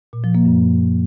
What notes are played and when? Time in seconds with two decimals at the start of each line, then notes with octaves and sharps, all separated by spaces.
0.13 A#2
0.24 F3
0.35 A#3
0.45 F#2